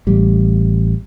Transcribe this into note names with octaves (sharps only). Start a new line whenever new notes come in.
A1 G3